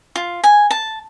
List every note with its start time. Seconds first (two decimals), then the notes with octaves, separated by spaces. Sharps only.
0.16 F4
0.44 G#5
0.71 A5